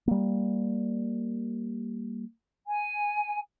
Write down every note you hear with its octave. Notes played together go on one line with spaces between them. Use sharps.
G3 A#3
G#5